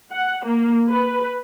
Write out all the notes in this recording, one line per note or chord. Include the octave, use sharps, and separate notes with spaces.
F#5
A#3
B4